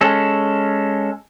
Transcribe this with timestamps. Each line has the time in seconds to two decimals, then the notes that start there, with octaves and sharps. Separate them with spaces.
0.01 G#3 C#4 A4